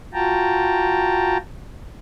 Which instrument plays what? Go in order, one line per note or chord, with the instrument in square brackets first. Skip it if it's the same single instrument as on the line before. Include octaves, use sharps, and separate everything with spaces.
[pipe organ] F4 F#4 G5 A5 A#5